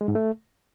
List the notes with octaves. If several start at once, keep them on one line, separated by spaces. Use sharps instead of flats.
G#3
G#2
A3